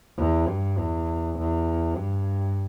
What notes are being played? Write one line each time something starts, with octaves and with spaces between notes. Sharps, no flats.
E2
G2
E2
E2
G2